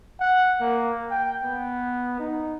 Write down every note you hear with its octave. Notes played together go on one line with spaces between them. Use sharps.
F#5
A#3
G5
B3
D#4